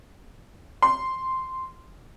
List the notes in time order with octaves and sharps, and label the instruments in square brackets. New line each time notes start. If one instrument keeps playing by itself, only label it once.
[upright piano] C6